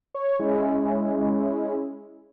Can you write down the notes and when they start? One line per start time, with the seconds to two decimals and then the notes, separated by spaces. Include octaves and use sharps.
0.15 C#5
0.39 G#3 C#4 E4